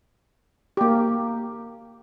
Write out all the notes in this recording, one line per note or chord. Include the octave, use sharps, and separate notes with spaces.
A#3 G4